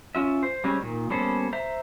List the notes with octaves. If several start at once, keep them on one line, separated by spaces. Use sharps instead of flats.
C#4 F4 E5
C5
G3 G#3 C4 C#4
A#2 D#3
G3 A#3 B3 C#4 A4 C5
C5 E5 A#5